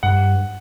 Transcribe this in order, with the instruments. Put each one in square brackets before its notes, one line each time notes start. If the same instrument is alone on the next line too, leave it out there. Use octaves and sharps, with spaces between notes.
[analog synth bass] G2 [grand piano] F#5